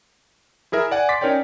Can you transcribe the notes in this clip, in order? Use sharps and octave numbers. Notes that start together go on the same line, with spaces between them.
E4 G#4 A#4 E5
D5 F#5 G#5
C6 D6 A6 B6
C#4 D#4 A#4 C#5 D5 G5